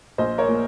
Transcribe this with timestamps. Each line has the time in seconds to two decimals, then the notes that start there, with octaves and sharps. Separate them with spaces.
0.18 A#1 C5 D#5
0.38 A#4 C#5
0.49 A#2